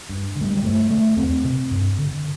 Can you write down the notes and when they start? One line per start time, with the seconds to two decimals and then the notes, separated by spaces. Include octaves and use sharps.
0.09 G2
0.36 D3
0.41 A3
0.45 G3
0.57 G3
0.63 G2 A3
0.90 D3 A3
1.17 E2 C4
1.44 C3
1.71 G2
1.99 D3